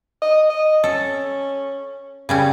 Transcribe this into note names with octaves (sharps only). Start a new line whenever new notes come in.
D#5
D#5
C#4 A4
C#3 G3 C#4